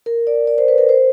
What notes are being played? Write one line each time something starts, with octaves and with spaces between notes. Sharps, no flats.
A#4
D5
D5
C5
B4
A#4
C5